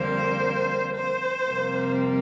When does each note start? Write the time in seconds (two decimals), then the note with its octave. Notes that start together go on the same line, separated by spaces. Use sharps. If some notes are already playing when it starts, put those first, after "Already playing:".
Already playing: F2 D3 G3 A#3 C5
0.95 C5
1.47 F2 C3 G3 A#3